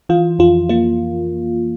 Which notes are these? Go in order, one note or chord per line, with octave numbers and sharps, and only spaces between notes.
E3 F4
F2 F4
A#3 F4